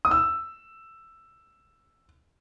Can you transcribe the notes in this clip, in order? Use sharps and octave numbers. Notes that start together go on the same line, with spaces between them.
D#6
E6